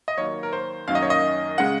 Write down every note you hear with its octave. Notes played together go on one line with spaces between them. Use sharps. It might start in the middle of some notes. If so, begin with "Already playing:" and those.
D#5
D#2 D#3 F#3 A#3 C#5
A#4
C5
F#2 D#3 F#3 A#3 F5
D#5
C#5
D#5
C#3 G#3 F#5